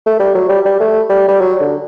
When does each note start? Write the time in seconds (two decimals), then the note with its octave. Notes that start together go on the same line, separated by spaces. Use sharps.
0.06 A3
0.20 G3
0.35 F#3
0.49 G3
0.65 G3
0.80 A3
1.10 G3
1.28 G3
1.41 F#3
1.60 D3